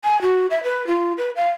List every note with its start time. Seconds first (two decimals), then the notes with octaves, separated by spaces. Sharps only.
0.04 G#5
0.22 F#4
0.51 E5
0.64 B4
0.87 F4
1.18 B4
1.36 F5